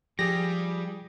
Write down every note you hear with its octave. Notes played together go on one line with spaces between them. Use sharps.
F3 G3 G4 G#4 A#6